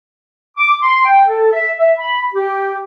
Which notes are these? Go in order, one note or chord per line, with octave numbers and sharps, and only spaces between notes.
D6
C6
G5
A4
E5
E5
B5
G4